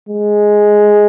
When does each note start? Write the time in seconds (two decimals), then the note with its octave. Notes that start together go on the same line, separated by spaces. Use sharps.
0.09 G#3